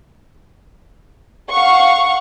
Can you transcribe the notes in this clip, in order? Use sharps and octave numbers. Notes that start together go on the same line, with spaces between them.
F5 F#5 C#6